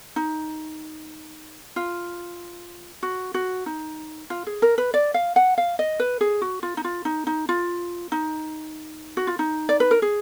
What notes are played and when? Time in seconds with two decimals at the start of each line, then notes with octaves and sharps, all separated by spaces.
0.16 D#4
1.76 F4
3.03 F#4
3.34 F#4
3.66 D#4
4.30 F4
4.47 G#4
4.62 A#4
4.78 B4
4.94 D5
5.14 F5
5.36 F#5
5.58 F5
5.79 D#5
6.00 B4
6.21 G#4
6.42 F#4
6.63 F4
6.77 D#4
6.84 F4
7.05 D#4
7.27 D#4
7.49 F4
8.12 D#4
9.17 F#4
9.27 F4
9.39 D#4
9.69 D5
9.80 B4
9.91 A#4
10.02 G#4